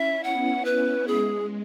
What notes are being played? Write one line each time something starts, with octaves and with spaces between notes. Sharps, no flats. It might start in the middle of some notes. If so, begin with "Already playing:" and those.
Already playing: C#4 E4 E5
B3 F#5
B4
G#3 G#4